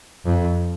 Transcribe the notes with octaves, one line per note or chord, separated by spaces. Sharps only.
F2